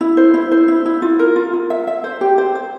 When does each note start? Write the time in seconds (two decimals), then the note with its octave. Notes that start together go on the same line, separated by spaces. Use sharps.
0.01 E4
0.17 C5
0.34 E4
0.51 C5
0.68 E4
0.86 E4
1.02 F4
1.19 A#4
1.36 F4
1.53 F4
1.70 E5
1.87 E5
2.04 C5
2.21 G4
2.38 C5
2.55 C5